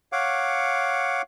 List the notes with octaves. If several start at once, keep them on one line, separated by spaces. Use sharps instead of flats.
C#5 F5 F#5 D6